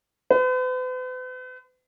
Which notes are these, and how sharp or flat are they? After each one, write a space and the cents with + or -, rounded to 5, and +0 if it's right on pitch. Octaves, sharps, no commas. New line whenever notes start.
B4 +45